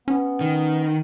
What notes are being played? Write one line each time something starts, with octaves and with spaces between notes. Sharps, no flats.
B3 C#4
D#3